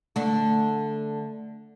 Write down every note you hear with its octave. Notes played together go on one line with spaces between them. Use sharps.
D3 A3